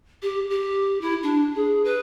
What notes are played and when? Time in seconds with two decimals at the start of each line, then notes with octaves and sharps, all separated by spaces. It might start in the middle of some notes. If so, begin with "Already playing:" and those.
0.22 G4
0.50 G4
1.01 E4
1.23 D4
1.56 G#4
1.85 B4